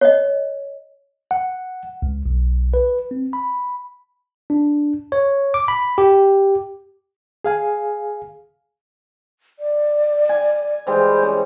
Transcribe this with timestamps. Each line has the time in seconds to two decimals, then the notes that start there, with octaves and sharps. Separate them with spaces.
0.01 C#5 D#5
1.31 F#5
2.02 C#2
2.26 B1
2.74 B4
3.11 C4
3.33 B5
4.50 D4
5.12 C#5
5.54 D6
5.68 B5
5.98 G4
7.44 G#4 F5 G#5
9.59 D5
10.29 G#5
10.87 E3 G3 G#3 C5
11.23 C#4